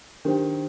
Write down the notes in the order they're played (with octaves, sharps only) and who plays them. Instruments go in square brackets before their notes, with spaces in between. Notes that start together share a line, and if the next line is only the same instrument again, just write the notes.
[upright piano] D#3 [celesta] D4 G4 C5 G5